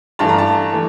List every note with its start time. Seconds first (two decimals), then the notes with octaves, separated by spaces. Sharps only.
0.19 G2 E3 A3 A5
0.29 A#5
0.38 A5
0.73 E3 A3